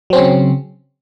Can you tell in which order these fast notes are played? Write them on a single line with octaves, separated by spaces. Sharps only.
F#3 C4 C#4 C#3